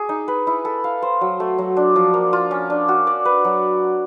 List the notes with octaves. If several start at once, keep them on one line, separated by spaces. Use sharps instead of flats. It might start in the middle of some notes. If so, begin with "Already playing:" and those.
Already playing: G#4
D#4
B4
E4
A4
F5
C5
F#3
A3
F#3
D4
F3
A#3
F4
C#4
D4
F#4
D5
B4
F#3